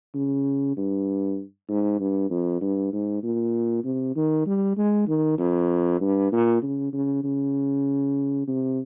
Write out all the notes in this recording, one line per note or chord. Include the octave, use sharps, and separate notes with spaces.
C#3
G2
G#2
G2
F2
G2
G#2
A#2
C3
D#3
G3
G#3
D#3
F2
G2
A#2
C#3
C#3
C#3
C3